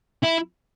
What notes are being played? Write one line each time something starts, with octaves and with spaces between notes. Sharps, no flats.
E4